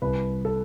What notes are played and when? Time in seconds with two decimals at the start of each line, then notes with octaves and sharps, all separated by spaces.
0.02 C2 B4
0.45 A4